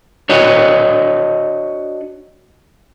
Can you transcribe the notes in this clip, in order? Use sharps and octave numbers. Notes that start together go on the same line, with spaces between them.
D4 F#4 C#5 D#5